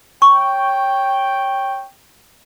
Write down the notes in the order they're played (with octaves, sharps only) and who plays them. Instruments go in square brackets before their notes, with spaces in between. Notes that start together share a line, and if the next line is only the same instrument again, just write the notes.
[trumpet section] C#5 G5 [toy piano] C#6